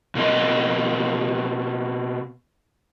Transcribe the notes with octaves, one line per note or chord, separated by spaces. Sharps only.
B2 A#3 C4 D#5